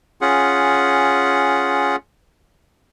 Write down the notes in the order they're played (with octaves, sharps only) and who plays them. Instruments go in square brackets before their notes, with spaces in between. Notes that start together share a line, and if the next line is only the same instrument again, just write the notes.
[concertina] C#4 F4 G#4 F#5